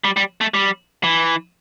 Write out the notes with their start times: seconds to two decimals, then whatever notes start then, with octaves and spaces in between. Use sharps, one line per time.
0.04 G3
0.17 G3
0.41 A3
0.54 G3
1.04 E3